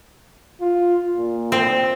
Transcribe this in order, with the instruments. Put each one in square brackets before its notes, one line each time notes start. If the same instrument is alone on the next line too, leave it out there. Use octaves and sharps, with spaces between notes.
[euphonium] F4
A#2
[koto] C4